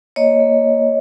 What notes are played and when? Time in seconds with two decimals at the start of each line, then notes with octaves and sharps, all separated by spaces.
0.16 A#3 C#5 D#5
0.40 A#3